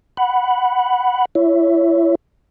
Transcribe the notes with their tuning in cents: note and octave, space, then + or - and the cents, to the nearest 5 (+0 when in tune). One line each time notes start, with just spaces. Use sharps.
F#5 +0 B5 +0
E4 +30 C#5 +15 E5 +0